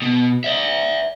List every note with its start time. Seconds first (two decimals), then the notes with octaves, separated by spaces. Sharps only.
0.02 B2
0.44 D5 E5